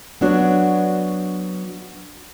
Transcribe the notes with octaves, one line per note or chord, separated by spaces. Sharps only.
F#3 B3 D4 F#4 C#5